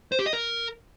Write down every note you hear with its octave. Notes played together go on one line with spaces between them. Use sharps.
C5
G4
D#5
A#4